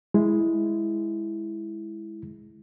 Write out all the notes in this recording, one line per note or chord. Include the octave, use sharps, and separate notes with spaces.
G#3 E4